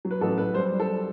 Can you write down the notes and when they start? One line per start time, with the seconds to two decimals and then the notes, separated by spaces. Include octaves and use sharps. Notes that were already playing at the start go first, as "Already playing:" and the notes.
0.05 F#3
0.11 B4
0.21 A1 A4
0.38 F#3 B4
0.54 G3 C5
0.71 G3
0.80 A4